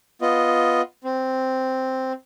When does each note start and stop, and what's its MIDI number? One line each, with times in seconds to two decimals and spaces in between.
0.22 0.81 59
0.22 0.81 65
0.22 0.81 75
1.04 2.12 60